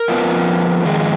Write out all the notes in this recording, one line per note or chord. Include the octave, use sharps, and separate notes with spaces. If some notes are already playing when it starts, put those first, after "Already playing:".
Already playing: A#4
F2 F3 B3
F2 D#3 G#3